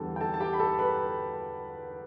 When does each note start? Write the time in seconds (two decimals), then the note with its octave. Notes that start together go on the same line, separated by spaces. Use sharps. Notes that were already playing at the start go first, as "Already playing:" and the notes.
Already playing: E2 D3 G3 G4 A4 A5
0.16 G5
0.21 A4 A5
0.34 A5
0.40 G4 G5
0.53 B5
0.59 A4 A5
0.79 B4 B5